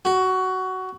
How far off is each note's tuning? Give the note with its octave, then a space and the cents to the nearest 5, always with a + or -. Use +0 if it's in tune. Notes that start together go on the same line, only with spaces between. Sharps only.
F#4 +15